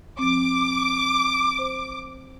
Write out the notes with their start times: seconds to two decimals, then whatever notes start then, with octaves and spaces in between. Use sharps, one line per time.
0.19 F3 C4 D6
1.59 C5